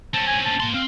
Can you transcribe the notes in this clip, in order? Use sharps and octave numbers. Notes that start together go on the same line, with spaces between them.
C4 C#4 A5
G#5
A5
A#3 C6
C4 F5